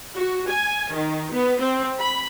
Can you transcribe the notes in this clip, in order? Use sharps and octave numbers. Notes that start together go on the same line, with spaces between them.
F#4
G#5
D#3
B3
C4
B5